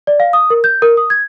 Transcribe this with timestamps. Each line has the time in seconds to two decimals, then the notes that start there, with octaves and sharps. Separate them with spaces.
0.07 D5
0.20 F5
0.33 D#6
0.50 A#4
0.64 G6
0.82 A#4
0.97 D#6
1.10 G#6